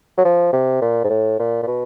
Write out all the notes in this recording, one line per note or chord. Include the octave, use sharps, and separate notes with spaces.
F#3
F3
C3
A#2
G#2
A2
A#2
A#2
B2